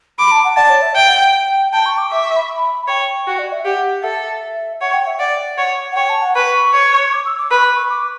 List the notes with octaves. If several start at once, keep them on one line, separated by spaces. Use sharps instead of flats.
B5 D6
A5
F#5
D5 A5
C#5
E5
E5 G5
F#5
G5
G5 A5
C#6
D6
E5 D6
C#6
B5
C#5 G5
F#4
D5
E5
G4 F#5
A4 E5
C#5 F#5
G5
E5
D5 F#5
C#5
F#5
C#5 G5
A5
F#5
B4 C#6
C#5
D6
E6
D6
B4 B5
C#6
B5
C#6
D6